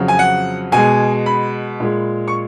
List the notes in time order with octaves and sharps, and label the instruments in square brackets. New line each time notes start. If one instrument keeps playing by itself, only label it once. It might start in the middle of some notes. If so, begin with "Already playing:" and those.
Already playing: [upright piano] F2 C#3 F#3
G#5
F#5
B2 G#3 G#5
B5
A#2 G#3
C#6